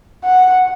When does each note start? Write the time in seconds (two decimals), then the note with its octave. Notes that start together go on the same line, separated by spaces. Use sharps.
0.24 F#5